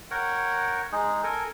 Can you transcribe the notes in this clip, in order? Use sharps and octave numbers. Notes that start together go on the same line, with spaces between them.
A#4 C#5 F#5 G5
G#3 D#4 G#4
A4 A#4 G#5